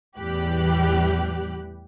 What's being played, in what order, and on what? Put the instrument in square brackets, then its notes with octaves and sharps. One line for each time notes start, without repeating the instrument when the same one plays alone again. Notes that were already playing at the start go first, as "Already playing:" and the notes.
[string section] E2 A2 E3 G3 G4 F#6